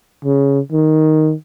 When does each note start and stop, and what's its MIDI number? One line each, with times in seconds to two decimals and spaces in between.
0.25 0.60 49
0.72 1.34 51